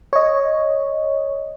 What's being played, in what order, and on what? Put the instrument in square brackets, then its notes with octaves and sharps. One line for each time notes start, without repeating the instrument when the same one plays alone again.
[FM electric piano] C#5 D#5